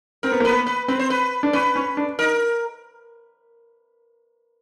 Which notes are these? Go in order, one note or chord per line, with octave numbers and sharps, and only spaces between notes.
C4 A#4
B3
A#3
B3 B4
B4
C4 B4
C5
B4
D4
C#4 B4
C#4
D4
D#4 A#4